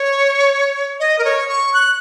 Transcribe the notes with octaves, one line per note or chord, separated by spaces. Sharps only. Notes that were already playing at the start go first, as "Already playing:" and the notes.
Already playing: C#5
D#5
A#4
C#5
C#6
F#6